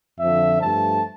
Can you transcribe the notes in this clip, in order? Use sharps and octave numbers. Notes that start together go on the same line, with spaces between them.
F2 D3 F3 E5
G2 F3 A3 A5